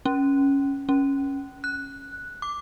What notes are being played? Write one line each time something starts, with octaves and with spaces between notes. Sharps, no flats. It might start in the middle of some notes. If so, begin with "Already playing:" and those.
C#4
C#4
F#6
D6